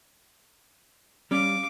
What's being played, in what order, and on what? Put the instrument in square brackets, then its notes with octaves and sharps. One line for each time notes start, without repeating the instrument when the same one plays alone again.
[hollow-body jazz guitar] G3 C#4 [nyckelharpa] F5 D6